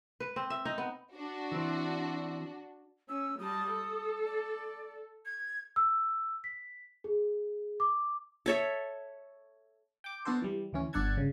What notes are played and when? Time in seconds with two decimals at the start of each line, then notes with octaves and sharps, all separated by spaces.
0.20 B4
0.36 C4
0.50 E5
0.65 D#4
0.78 B3
1.13 D4 F#4
1.52 E3 C4
3.09 C#4 E6
3.39 G3 A5 D#6
3.71 A4
4.26 D5
5.25 G#6
5.76 E6
6.44 B6
7.04 G#4
7.80 D6
8.46 A4 C#5 E5
10.04 G5 D6
10.25 B3 D4 F#4 A4 C5
10.42 E3 G3
10.73 D2 E3 C#4
10.93 G1 D4 A4 F#5 A5 G#6
11.17 C#3